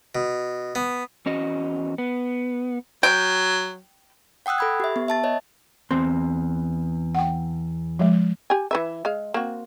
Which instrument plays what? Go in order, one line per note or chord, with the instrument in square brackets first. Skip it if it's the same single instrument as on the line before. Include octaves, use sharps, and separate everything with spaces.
[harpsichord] B2
B3
[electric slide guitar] E2 C#4 F#4 D#5
B3
[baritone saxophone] F#3 [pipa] G5
[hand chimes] F#5 G5 D#6 E6 F#6
A4 B5 G#6
G4 E5
B3
E5 A5 A6
C#5 D#5
[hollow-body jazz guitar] E2 C4 C6
[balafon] F#5 G5
F3 G#3
[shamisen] G4 G#5
E3 B4 E5
G#3 F5
A#3 C4 F#4